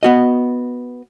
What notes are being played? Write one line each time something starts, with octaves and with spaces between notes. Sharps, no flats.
B3 F#4 D#5